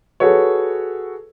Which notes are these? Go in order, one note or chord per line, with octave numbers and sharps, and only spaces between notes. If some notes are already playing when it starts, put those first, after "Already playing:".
F#4 G#4 A4 B4 C#5